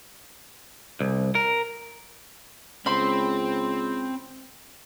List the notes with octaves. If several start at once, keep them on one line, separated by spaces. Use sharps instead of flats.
C2
A#4
C#2 C4 B5 C6